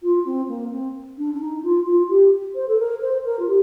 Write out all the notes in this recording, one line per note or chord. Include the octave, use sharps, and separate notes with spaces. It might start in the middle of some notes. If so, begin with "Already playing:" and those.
F4
C4
A#3
C4
D4
D4
D#4
F4
F4
G4
C5
A4
A#4
C5
A#4
F4
G4